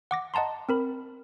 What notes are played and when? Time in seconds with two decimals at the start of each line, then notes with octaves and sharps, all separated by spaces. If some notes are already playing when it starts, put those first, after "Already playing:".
0.11 F#5 D6 A#6
0.34 D#5 F#5 A5 A#5 C6
0.69 C4 A#4 B5